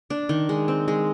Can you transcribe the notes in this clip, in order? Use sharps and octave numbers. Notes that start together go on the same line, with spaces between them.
D4
D#3
G#3
C4
G#3